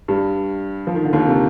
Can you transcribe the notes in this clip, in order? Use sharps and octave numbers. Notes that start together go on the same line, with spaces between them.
G2 G3
F3
D#3
D3
D#2 D#3
C3